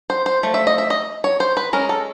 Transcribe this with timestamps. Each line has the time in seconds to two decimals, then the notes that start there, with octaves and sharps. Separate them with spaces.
0.10 C5
0.26 C5
0.43 F3 A3
0.54 E5
0.67 D#5
0.78 E5
0.90 D#5
1.24 C#5
1.40 C5
1.57 B4
1.73 G#3 C#4 A#4
1.89 A4